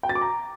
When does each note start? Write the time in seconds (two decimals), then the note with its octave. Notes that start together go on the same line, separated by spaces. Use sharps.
0.03 G5
0.09 A6
0.15 D6
0.21 A#5